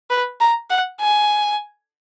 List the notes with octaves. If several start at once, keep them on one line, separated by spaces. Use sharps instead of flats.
B4
A#5
F#5
G#5